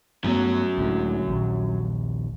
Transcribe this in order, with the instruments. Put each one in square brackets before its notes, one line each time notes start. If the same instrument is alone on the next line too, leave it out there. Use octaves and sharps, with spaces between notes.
[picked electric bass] G2 A3 B3 [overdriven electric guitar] F#3 C#4
[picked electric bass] C#2 A2 D3
A#1 D#2